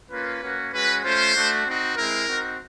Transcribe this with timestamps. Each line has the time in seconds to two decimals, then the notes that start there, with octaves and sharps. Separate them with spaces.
0.10 A#3 C#4 F4 B4
0.42 A#3 C#4 F#4
0.73 G#3 C#4 F#4 B4
1.04 A3 C#4 F4 C5
1.34 A3 D4 F#4
1.65 C4 D#4 F#4
1.96 G#3 C4 E4 A#4
2.27 C4 D#4 F#4